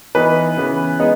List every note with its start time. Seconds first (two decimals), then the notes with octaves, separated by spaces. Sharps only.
0.15 E3 B3 D#4 B4
0.57 C#3 E3 B3
1.00 G#3 B3 D#4